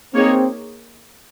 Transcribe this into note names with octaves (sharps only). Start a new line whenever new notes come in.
A#3 C4 D#4 G#4 C#5